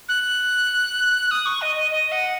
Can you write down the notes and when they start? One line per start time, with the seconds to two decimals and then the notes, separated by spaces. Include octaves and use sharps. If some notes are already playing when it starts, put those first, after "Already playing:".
0.09 F#6
1.31 D#6
1.46 C#6
1.62 D#5
1.76 D#5
1.91 D#5
2.12 F#5